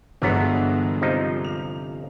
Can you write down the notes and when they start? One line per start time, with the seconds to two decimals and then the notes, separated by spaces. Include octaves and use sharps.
0.22 G1 B2 E3 F#3 G#3 B3
1.02 C3 F3 D#4
1.45 F7